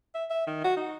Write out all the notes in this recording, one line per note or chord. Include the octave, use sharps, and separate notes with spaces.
E5
E5
D#3
F#4
D#4